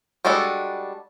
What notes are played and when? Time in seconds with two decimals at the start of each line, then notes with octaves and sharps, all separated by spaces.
0.25 G3 G#3 D4 F#4 A4